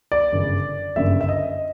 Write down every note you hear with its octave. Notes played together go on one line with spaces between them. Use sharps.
D5
G1 F#2 C#3
G1 F#2 C#3 E5
E5
D#5